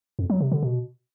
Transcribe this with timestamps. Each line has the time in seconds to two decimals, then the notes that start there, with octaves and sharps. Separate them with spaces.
0.19 F2
0.30 F#3
0.41 C3
0.51 D3
0.62 B2